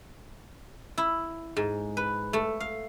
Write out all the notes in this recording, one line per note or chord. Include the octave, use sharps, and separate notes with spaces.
E4
G#2
B4
A3
F5